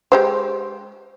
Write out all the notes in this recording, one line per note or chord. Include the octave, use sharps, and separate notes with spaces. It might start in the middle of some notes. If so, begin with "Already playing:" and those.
G#3 G4 C5